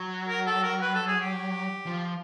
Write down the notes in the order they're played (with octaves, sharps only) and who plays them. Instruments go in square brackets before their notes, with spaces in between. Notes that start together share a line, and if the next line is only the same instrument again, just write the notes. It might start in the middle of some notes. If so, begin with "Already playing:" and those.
Already playing: [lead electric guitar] F#3
[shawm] A#4
A4
A#4
B4
A4
G#4
G4
[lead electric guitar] F3